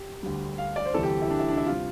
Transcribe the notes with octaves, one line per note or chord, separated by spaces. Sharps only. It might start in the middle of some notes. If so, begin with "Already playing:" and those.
Already playing: G4
D2 D3 G3
F5
D5
C5
D2 C3 E3 G3 A4
G4
E4
D4
E4
D4
E4
C3 G3 F4